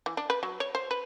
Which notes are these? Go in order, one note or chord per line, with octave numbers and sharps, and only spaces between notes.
E3
D4
B4
F#3
C#5
C5
B4